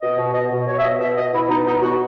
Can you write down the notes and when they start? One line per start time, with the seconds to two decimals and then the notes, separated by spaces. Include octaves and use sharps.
0.01 B2 D#5
0.18 B2
0.34 B2 D#5
0.51 B2
0.67 B2 C#5
0.78 E5
0.83 B2 D#5
1.00 B2 E5
1.17 B2 D#5
1.33 B2 E4
1.49 B2 D#4
1.66 B2 D#4
1.82 B2 F#4